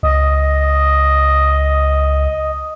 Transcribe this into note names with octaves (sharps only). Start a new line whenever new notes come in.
C#2 D#5